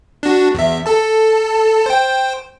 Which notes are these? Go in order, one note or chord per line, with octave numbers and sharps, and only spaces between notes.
D4 F#4
E2 E5
A4 A5
C5 G5